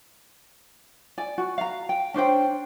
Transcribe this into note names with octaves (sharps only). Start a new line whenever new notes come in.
D5 G#5
F#4
F5 A#5
G5
C#4 D4 C5 G5